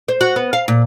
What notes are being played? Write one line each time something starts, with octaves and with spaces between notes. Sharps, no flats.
C5
F#4
B3
F5
A#2